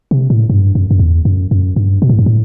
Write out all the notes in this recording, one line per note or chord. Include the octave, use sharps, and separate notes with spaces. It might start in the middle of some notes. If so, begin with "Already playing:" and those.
C3
A2
G2
F#2
F#2
E2
F#2
F#2
G2
B2
A2
G2
A2